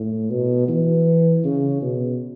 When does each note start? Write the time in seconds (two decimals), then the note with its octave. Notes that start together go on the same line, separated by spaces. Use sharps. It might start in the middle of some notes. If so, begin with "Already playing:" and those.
Already playing: A2
0.30 B2
0.68 E3
1.44 C#3
1.82 B2